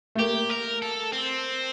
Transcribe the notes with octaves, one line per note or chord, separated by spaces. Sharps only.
A3
A#3 G4
A#4
A4
C4